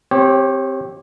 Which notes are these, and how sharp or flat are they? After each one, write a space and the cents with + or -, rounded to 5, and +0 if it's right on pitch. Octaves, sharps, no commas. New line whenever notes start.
C4 +0 G4 +0 C#5 -30